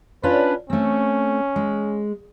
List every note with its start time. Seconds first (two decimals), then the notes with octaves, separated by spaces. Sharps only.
0.23 C#4 D4 F4 B4
0.70 A3 C4 C#4
1.56 G#3